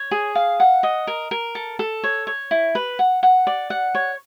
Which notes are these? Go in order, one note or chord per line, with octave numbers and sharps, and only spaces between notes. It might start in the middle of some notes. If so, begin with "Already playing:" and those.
Already playing: C#5
G#4
F5
F#5
D#5
A#4
A#4
A4
A4
C#5
C#5
E4
B4
F#5
F#5
D5
F#5
C#5